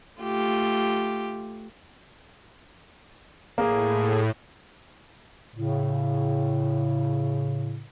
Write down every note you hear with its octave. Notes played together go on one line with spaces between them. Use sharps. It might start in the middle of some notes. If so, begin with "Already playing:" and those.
A3 F4 G4
A2 A#3 G#4
A2 C#3